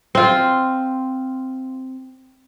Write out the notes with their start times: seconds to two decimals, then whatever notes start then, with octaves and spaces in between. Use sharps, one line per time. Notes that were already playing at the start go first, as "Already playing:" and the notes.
0.15 C4 F4